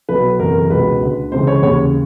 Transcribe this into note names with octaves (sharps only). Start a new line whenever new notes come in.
B1 B2 B4
F#1 E2 C3 E3 A#4
A#4
C#2 B2 B4
D2 D3
C#2 C#3 E3 C5
C#5
D#2 C#3 E3 C#5